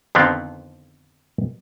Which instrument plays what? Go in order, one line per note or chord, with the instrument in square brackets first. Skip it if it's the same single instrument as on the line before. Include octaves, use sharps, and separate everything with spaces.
[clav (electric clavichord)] F2 D3 D#3 F3 B3 C4